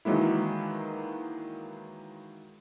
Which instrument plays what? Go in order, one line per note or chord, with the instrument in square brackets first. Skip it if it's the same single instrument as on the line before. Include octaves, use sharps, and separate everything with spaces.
[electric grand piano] D#3 E3 F#3 G#3 A#3 E4